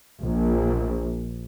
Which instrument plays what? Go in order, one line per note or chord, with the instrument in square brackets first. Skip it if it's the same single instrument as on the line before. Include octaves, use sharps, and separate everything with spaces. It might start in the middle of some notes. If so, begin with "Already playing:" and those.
[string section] A#1